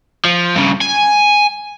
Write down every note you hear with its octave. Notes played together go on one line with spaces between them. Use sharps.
F3
G2 C#3
G#5